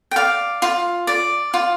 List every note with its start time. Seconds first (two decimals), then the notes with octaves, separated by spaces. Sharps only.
0.11 G5
0.16 D5 F5
0.62 F4
1.07 D5
1.54 F4